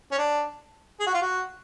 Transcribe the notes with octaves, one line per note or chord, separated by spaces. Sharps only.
C#4
D4
G#4
F#4
F4
F#4